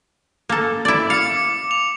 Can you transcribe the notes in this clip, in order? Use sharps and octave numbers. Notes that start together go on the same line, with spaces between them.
A#3 A4
E4 D5
F5 D6 C#7
F7